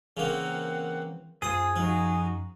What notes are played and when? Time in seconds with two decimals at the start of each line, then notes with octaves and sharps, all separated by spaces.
0.17 C#3 E3 A#3 C4 F#5
1.42 F#2 F4 G#4 C5 D#6
1.76 F3 D#4 F#4